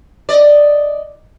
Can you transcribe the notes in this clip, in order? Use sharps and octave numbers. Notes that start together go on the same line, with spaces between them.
D5 D#5